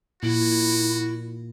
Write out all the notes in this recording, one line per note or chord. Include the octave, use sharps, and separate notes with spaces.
A#2 E4 F#4